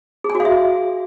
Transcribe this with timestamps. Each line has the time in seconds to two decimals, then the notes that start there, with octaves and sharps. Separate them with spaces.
0.24 G#4
0.30 G#5
0.35 F#4
0.40 F5
0.45 E5